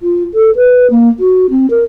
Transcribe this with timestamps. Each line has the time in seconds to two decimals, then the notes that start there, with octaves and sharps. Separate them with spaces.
0.01 F4
0.34 A4
0.56 B4
0.90 A#3
1.20 F#4
1.50 C4
1.70 A#4